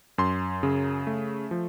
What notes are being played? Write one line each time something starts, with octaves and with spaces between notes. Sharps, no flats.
F#2 C6
C#3
A3
F3